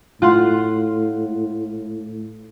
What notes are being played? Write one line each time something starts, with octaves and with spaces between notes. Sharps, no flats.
A2 F4 F#5 C6